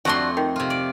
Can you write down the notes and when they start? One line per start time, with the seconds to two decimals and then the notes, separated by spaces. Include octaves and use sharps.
0.05 F2 A3 D4 F#4 C6
0.37 D#3
0.56 C3 F4
0.70 D5